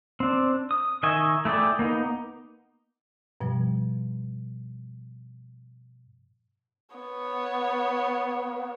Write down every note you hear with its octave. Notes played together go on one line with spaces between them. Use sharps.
C4 D4
D#6
D#3 D#5 E5 G#5 C#6
A3 E4 G#4 D5 G5
A#3 B3 D#4
G2 B2 F3 G3
B3 C#5